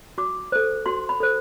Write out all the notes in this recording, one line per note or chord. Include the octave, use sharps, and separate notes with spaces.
F#4 D6
A4 C5
F#4 C6
B5
A4 C5